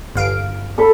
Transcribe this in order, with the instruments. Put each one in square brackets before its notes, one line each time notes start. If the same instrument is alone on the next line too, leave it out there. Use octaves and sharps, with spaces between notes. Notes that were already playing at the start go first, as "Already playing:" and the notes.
[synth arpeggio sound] G1 F5 D7
[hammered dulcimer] A4 B5